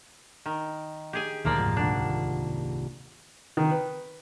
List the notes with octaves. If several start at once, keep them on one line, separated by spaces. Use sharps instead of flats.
D#3
G4 G#4 G#5
D2 A#2 D#3 F3 A#3 D5
F2 G#2 C3
D#1 C2 D4 F#5
D#3
B4